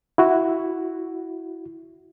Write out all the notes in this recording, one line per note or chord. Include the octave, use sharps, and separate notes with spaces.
E4 F#4